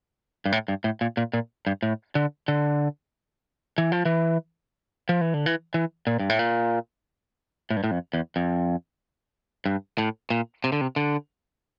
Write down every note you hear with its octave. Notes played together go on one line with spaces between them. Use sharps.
G2
A2
G2
A2
A#2
A#2
A#2
G2
A2
D3
D3
E3
F3
E3
F3
E3
D3
E3
E3
A#2
G2
A2
A#2
A2
G2
A2
F2
E2
F2
G2
A2
A#2
C3
D3
C3
D3